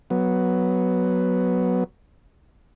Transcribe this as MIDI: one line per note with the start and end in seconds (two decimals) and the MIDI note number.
0.10 1.84 54
0.10 1.84 59